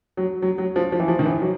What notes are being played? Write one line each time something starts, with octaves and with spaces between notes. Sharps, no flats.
F#3
F#3
F#3
F3
F3
E3
F3
D#3
E3
F#3